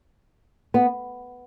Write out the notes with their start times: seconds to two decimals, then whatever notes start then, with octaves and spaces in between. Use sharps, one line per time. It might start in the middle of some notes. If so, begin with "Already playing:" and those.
0.74 B3